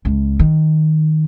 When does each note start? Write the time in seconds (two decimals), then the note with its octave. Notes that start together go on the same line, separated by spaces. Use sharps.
0.05 C#2
0.39 D#3